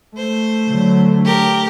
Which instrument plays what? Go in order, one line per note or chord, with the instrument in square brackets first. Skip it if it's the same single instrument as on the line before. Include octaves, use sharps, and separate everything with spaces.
[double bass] A3 [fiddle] C5
[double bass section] D3 F#3
[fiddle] G4 A#4